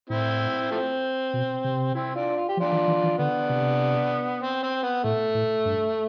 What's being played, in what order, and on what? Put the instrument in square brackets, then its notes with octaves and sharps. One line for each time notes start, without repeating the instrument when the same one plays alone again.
[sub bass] A2 [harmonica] C4 E4
[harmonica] F3 A3 C4
[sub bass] B2
C3
[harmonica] C4 E4
D4 F4
F4
G4
[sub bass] F3
[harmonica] D4 F4
[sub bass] E3
E3
E3
[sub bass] D3 [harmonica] B3 D4
[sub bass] C3
[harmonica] C4
C4
B3
[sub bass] A2 [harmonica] A3
[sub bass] A2
G2